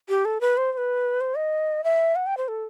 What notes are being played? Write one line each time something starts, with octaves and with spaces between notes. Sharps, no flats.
G4
A4
B4
C5
C5
B4
C5
D#5
E5
F#5
G5
C5
A4